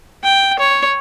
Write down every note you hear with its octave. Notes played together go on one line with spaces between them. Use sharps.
G5
C#5